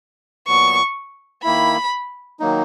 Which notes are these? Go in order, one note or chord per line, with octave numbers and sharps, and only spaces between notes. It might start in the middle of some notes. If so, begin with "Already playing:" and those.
A#2 F#3 B3 C#6
D#3 A#3 E4 B5
D#3 F#3 A#3 D#4